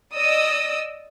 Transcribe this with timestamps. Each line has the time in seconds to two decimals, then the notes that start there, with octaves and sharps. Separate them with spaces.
0.15 D5 D#5 D#6 E6